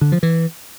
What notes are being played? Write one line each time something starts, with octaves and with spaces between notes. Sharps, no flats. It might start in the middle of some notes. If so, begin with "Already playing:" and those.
D3
F3
E3